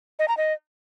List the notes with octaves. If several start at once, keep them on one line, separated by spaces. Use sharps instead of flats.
D#5
A#5
D#5